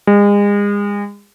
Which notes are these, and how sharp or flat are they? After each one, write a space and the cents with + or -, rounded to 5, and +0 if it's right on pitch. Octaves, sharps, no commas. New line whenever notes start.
G#3 -35